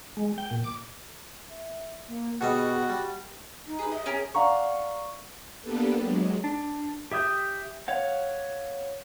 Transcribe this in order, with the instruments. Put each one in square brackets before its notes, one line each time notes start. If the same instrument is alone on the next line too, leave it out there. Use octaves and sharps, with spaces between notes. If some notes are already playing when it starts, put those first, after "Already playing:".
[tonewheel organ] G#3
G5
A#2
D6
[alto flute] E5
A#3
[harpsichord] B2 G3 D#5 [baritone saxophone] F#4 [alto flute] G#4
[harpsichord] G3 [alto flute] G4
[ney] D#4
[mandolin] G#4 B4
[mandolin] D#5 [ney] E5
[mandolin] C#4 A#4 [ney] G#4
[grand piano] D5 F5 F#5 A#5 C#6
[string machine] A#3 B3 D4 G4 A4 B4
F#3 G#3
[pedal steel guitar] D4
G4 E5 D#6 G6
C#5 F5 F#5